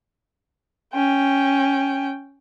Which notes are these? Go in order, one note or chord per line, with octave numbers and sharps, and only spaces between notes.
C#4 G5